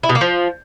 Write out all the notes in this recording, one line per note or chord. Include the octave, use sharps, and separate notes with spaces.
E4
B2
A#3
F3